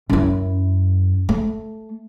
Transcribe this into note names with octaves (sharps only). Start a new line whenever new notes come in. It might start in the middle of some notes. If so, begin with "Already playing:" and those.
F#2 E4
A3